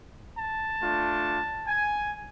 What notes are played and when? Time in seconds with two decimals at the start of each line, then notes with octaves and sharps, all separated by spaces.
0.38 A5
0.81 A3 D4 F4
1.66 G#5